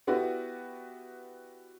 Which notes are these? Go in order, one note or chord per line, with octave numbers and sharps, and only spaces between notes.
B3 E4 F#4 G4 B4 D5